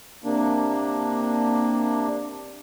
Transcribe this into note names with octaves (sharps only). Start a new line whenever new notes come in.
C3 A#3 D4